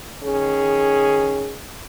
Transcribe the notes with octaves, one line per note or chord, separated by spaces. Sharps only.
D#3 C#4 G#4